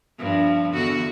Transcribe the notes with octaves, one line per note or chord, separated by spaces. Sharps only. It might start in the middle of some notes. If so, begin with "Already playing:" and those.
G2 F3
E2 D3 F#4